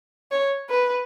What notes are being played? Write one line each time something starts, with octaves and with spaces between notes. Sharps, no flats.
C#5
B4